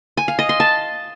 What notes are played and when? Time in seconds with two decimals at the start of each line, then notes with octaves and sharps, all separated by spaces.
0.17 G#5
0.28 F5
0.39 D#5
0.49 C6
0.60 A5